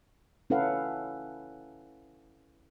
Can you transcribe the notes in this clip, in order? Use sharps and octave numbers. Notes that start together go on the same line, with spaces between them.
C#4 E4 A4 B4 F5 F#5